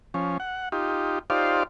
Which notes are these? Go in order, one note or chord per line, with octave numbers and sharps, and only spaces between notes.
F3 C#4
F#5
D#4 F4 G4
D#4 F4 G4 C5 D5 F5